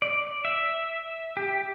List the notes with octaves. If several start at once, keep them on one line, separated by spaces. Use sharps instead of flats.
D5
E5
G4